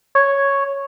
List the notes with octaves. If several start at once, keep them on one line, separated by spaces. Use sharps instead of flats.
C#5